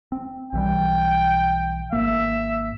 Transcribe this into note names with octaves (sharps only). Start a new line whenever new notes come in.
C4
B1 E3 G3 G5
G#1 A#3 E5